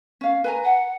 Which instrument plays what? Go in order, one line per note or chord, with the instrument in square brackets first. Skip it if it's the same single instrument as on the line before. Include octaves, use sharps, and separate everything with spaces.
[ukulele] C#4 F5
B4 G#5 A#5
[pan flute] F#5